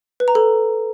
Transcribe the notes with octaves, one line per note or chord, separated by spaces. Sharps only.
B4
A#5
A4